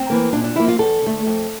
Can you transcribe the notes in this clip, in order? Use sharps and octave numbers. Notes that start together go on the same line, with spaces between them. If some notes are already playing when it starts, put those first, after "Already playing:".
Already playing: C4
E3 A#3
A#2 D4
D4
F3 A#3 E4
F4
E2 A4
D3 A3
F2